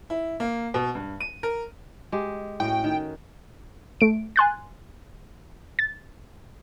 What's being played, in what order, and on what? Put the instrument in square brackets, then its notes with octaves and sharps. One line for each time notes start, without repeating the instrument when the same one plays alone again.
[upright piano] E4
A#3
B2
G2
D#7
A#4
[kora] G#3 G4
[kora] A2 C#4 F#4 [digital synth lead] G5
[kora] D#3
[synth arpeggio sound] A3 D7
G#5 C6 F#6 A6
A6